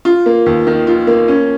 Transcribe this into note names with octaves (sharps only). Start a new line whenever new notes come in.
F4
A#3
D#2
D#3
F4
A#3
C#4